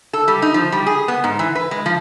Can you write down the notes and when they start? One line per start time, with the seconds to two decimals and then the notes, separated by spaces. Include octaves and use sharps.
0.13 A4
0.28 G3
0.42 D#4
0.54 F3
0.72 G3
0.86 G#4
1.08 B3
1.24 G#2
1.39 E3
1.55 B4
1.71 G#3
1.86 F3